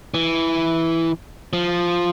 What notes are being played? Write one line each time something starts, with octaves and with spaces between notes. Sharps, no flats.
E3
F3